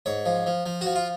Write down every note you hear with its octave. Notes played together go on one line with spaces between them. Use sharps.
G#2 C#5
F3
F3
F3
F3 F#4
F4